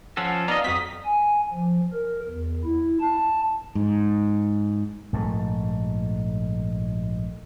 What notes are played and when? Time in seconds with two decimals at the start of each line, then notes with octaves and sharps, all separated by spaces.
0.17 F3 C#4 A4 F#5
0.48 B3 D#4 D5 D#5 F5 A#5
0.64 F2 F#3 C4 D#6 B6
1.05 G#5
1.52 F3
1.93 A#4
2.30 E2
2.65 E4
3.01 A5
3.75 G#2
5.13 A#1 G#2 D3 A3